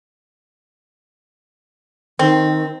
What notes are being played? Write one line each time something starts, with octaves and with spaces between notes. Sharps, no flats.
D#3 C4